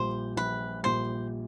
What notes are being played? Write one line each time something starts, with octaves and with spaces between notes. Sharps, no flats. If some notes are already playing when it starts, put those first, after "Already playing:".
Already playing: A#1 A#2 G3 C5
A#1 B4
A#2 G3 C5